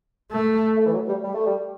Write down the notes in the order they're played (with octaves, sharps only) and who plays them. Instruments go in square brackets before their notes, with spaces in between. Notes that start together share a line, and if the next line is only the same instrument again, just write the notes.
[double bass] A3
[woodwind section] A3
E3
F#3
G3
G3
A3
G3